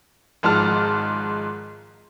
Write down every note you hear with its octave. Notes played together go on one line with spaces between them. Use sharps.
G#1 G#2 F3 A5 F6